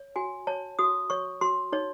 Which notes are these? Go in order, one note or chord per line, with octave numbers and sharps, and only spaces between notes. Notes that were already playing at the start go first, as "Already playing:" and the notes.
Already playing: C#5
F#4 G#5
C#5 A5
F#4 D#6
C#5 C#6
F#4 C6
D#4 C#5